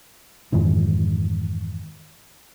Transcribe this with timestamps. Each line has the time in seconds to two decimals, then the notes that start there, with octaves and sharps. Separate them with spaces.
0.52 F2 G#2 D#3 E3